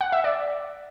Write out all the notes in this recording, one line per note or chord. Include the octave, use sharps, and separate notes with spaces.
F#5
E5
D5